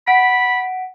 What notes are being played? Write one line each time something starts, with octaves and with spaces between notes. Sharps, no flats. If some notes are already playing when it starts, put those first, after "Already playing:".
F#5 B5 B6 D7